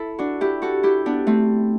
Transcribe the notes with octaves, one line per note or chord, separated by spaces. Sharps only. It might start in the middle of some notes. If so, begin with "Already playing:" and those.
Already playing: E4 A4
D4 F#4
E4 G4
F#4 A4
E4 G4
B3 D4
A3 C4